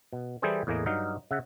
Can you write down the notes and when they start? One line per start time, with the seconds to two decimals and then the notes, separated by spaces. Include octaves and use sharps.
0.13 B2
0.42 E3 G3 E4 G#4 A4 C5
0.67 E2 A2 A#3 G#4 D#5
0.86 G2 F#3 D#4 F5
1.31 C#3 E5 F#5